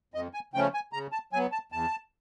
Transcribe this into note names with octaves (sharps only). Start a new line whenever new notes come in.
F2 D#5
G#5
C#3 F3 A3 C#4 G5
G#5
C#3 A#5
A5
F#3 B3 G#5
A5
E2 A5